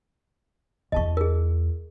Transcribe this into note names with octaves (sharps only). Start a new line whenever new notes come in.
E2 E4 D#5 A5 C#6
G#4 A#4